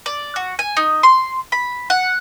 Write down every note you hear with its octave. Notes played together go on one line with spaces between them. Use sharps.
D5
F#4
G#5
D#4
C6
B5
F#5